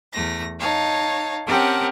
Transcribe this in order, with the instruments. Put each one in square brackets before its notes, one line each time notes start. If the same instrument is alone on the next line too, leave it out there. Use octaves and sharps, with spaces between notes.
[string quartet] E2 A3 A#6
D#4 C#5 F5 A5
C4 C#4 G4 A#4 F#5 A5